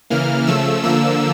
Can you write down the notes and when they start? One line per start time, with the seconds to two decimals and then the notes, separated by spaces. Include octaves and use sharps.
0.10 C#3 E3 A#3 F6
0.47 C#3 F3 A3 E6
0.84 D3 F3 A#3 E6